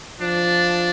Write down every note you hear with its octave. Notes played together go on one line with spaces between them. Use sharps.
F3 D4